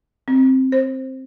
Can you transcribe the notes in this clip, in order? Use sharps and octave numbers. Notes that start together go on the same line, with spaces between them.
C4
C5